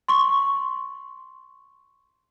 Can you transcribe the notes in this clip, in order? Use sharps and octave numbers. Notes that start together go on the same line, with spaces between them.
C6 C#6